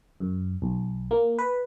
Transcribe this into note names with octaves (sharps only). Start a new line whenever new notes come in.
F#2
B1
A#3
B4